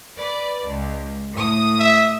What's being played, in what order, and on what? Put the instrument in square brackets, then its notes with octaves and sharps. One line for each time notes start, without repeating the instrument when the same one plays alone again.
[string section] B4 D5
C#2
A2 D#6
[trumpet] E5